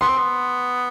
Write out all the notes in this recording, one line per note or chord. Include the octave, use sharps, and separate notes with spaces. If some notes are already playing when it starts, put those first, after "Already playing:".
B3 C6
C4
B3